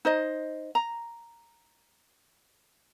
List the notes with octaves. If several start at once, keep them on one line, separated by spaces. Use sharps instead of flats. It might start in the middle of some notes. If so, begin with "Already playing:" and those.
D#4 C5 D#5
A#5